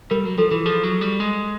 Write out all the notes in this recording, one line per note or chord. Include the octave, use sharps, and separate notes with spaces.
G3 A#4
F#3
F3 A4
E3
F3 G#4
F#3
G3
G#3